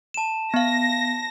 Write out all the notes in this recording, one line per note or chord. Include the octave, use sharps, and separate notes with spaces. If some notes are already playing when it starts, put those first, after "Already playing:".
A5 E7
B3 F5 A#6